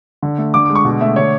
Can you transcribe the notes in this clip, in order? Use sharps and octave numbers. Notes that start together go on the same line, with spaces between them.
D3
A3
D3 D6
D6
G#3
C#6
B2
A3 E5
D3 C#5